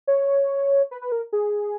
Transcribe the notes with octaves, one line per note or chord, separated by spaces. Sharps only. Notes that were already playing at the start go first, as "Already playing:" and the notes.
C#5
B4
B4
A#4
G#4